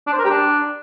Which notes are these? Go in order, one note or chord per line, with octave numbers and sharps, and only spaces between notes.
D4
C5
A#4
G4
D4